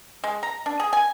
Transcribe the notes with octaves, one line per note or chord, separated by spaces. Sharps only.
G#3
A#5
D4
G#4
G#5